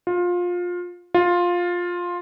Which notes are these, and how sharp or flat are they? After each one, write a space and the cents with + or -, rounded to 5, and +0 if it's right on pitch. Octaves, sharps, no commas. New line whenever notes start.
F4 +20
F4 +10